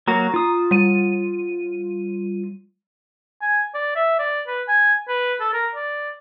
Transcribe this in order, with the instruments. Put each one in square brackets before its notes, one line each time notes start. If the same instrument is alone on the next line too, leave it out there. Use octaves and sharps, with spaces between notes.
[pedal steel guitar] F#3 A#3 F#4 [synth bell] A#5
[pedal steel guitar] F4 D#6
[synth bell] G3 D#7
[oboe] G#5
D5
E5
D5
B4
G#5
B4
A4
A#4
D5